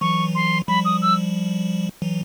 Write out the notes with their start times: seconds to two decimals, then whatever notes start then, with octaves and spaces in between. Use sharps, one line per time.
0.01 E3 F#3 C#6
0.35 C6
0.68 F3 G3 B5
0.85 D#6
1.02 E6
2.02 E3 F#3